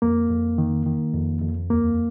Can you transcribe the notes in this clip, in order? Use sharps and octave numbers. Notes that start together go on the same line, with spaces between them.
F2 A#3
F2
D#3
D#3
F2
F2
D#2 A#3